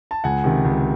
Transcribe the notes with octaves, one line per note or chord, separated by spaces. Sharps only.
A5
C#2 F#5 G#5
C3 D#3
C#2